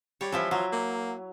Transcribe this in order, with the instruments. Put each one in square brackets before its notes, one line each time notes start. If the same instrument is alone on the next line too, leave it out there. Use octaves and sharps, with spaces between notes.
[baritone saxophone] G3 [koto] C#5
[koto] E3 F3 E4
[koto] F#3 [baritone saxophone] F4
[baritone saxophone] A#3